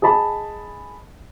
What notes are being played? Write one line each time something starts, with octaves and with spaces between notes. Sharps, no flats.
G#4 D#5 A5 B5